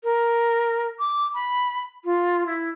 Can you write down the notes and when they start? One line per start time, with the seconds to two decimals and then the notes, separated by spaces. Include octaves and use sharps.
0.04 A#4
1.00 D6
1.35 B5
2.05 F4
2.46 E4